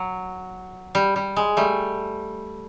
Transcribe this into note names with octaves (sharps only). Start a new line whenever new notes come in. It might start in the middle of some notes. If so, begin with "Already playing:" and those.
Already playing: F#3
G3
G3
G#3
G3 A3